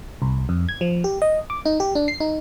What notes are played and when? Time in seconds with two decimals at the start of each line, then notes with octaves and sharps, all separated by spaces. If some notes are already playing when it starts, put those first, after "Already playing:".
0.22 C2
0.49 F2
0.69 G#6
0.81 F3
1.04 G4
1.22 D#5
1.50 D6
1.66 D#4
1.80 G4
1.95 D4
2.08 C7
2.20 D#4